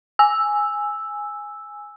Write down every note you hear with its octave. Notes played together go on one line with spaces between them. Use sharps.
G#5 E6